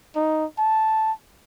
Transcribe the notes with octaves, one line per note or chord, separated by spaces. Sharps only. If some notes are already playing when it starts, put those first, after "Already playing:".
D#4
A5